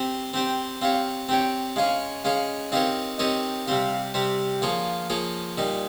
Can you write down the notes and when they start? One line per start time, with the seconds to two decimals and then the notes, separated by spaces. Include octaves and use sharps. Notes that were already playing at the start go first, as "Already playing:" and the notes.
Already playing: C4 G4 C5
0.34 C4 G4 C5 G5
0.82 C4 G4 C#5 F5
1.29 C4 G4 C#5 G5
1.76 G#3 C#4 G#4 C#5 F5
2.24 G#3 C#4 G#4 C#5 F5
2.72 C4 D#4 G4 A#4 C#5 F5
3.19 C4 D#4 G4 A#4 C#5 D#5
3.67 C3 G3 C4 G4 F5
4.14 C3 G3 C4 G4
4.62 F3 A#3 F4 G#4 C#5 F5
5.10 F3 A#3 F4 G#4 C#5
5.58 A#2 G3 A#3 D#4